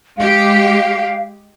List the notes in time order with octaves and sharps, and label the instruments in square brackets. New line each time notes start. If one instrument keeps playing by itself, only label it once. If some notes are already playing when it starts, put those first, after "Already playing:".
[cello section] G#3 G4 [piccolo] F5